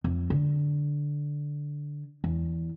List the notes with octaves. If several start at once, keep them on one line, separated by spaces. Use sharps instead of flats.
F2
D3
E2